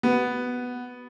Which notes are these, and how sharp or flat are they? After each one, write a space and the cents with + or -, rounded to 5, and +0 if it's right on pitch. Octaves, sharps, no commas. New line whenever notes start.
B3 +0 F#4 +45